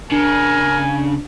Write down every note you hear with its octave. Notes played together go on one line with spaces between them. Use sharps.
C#3 D4 A#4 G#5